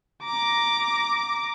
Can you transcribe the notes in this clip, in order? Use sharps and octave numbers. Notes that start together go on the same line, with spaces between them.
A#5 D6